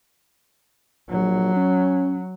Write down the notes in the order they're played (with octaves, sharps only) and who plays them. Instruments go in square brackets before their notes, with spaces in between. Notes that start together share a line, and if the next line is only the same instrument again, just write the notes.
[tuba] A#1 [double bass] F#3
[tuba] C#4